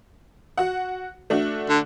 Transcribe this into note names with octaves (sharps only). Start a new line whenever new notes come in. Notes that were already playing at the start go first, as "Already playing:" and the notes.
F#4 F#5
A3 D4 F#4
D3